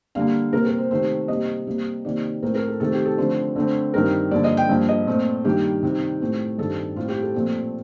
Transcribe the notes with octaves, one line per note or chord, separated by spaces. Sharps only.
D3 G3 A#3 F5
C3 G3 A#3 A#4
A#4
C5
C3 D#3 A3 C5
C3 G3 A#3 D#5
C3 G3 A#3
C3 D#3 A#3 D5
A2 A3 C4 A#4
A#4
A4
C3 D#3 A3 C4 A4
G4
A4
D3 F3 A3 C4 C5
D3 A3 C4
G2 D#3 G3 C4 A#4
G2 D3 F3 A#3 D5
D#5
G5
G2 F3 A#3
D#5
A#2 A3 C4
G2 D#3 G3 A#3 G4
C3 D#3 G3
A2 A3 C4
G2 D#3 G3 C4 A4
A2 G3 C4 F4
G4
A4
A#2 F3 A3 C4